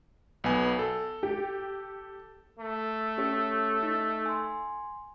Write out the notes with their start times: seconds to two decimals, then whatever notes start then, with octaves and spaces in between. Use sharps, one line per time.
0.44 B1 B3 G#5
0.79 A4
1.23 G4
2.59 A3
3.18 C#4 G4 C#5
3.83 D#4
4.26 G#5 C6